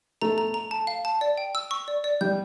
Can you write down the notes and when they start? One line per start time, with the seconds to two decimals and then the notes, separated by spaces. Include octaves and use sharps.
0.22 A3 A#5
0.38 A#5
0.54 A#5
0.71 A5
0.87 F5
1.05 A5
1.21 D5
1.38 G5
1.55 E6
1.71 C#6
1.88 D5
2.04 D5
2.21 G3 G6